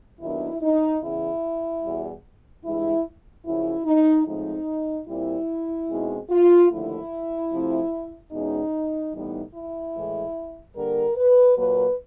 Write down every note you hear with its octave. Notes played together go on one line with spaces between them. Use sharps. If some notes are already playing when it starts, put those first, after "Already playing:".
D#2 D#3 F#3 B3 D4 E4
D#4
E2 C#3 E3 E4
E2 B2 G3
G2 E3 G#3 E4
F#2 C#3 F3 E4
D#4
A2 F3 G#3 C4 D#4
A#2 G3 C4 E4
B2 G#3 C4 D#4
F4
D#2 D3 F3 A3 E4
C3 F3 A3 C4
E2 B2 G#3 C#4 D#4
A2 E3 G3 B3 D#4
E4
A2 E3 G#3
D3 G3 A#3 A#4
B4
A#2 F#3 A#3 B4